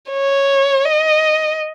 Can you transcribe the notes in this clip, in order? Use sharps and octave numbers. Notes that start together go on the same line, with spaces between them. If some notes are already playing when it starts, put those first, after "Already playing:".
C#5
D#5